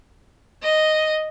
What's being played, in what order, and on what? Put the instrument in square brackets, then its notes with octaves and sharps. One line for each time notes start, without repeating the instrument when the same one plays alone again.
[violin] D#5